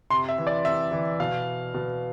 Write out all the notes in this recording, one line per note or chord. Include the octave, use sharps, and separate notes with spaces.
C3 C6
E5
E3
D5
C3 E5
E3
B2 F5
B2